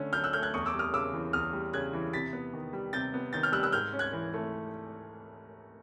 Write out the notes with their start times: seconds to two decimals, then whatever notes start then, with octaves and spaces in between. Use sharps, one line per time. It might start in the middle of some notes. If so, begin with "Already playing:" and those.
Already playing: D3 A3 C#4
0.13 F#3 F6 G6
0.24 E6 F#6
0.33 A3 F6 G6
0.43 F#6 G#6
0.54 E2 C#6 D#6
0.66 D6 E6
0.73 G3
0.79 D#6 F6
0.93 C#3 D6 E6
1.13 E3
1.33 E2 D#6 F6
1.53 G3
1.73 C#3 F#6 G#6
1.93 E3
2.13 C3 A6 B6
2.33 B3
2.53 D#3
2.73 G3
2.93 C3 G6 A6
3.14 B3
3.33 D#3 G6 A6
3.43 F6 G6
3.52 G3 E6 F#6
3.63 E6 F#6
3.72 G#2 F6 G6
3.93 C#4
3.99 F#6 G#6
4.13 E3
4.34 A3